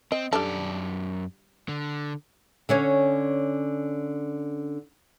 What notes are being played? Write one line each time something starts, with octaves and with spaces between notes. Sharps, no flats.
C4 D#5
F#2 G3 D4 A4 D5
D3
D3 C#4 C#5